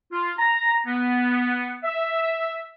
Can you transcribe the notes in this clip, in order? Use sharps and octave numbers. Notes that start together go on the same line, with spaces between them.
F4
A#5
B3
E5